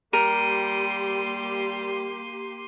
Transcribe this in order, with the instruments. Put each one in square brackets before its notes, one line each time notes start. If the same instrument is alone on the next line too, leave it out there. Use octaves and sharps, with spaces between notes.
[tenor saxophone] G3 [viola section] A#3 G4 C6 [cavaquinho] A#4 [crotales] D#7